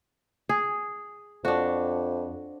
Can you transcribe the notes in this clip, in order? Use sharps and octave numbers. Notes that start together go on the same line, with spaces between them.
G#4
F2 D4 F#4